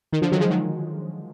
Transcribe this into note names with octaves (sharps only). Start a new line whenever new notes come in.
D#3
D3 F3
D#3 F#3
F3 G#3
D#3 F#3